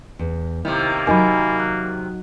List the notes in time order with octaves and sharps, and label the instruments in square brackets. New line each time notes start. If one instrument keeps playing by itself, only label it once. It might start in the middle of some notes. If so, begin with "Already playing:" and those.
[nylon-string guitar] E2
[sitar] C3 D#3 [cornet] A#3 [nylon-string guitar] E4
[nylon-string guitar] F#3 D#4 A#4 [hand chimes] G#5 B5
[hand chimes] F#6